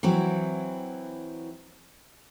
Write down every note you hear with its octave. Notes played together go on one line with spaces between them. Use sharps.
E3 F#3 C4 E4